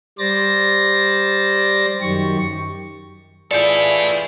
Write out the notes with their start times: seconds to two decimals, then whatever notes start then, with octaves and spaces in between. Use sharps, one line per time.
0.19 G3 C5 D5 A6 A#6
2.02 F#2 D#3 G4 C#6
3.51 E3 E4 F4 G#4 A4 D5 G6